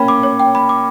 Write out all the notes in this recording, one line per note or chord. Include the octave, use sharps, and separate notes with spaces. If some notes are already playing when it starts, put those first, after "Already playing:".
Already playing: A#3 C#4 C#5 G5 B5
D6
C#5
G5
B5
D6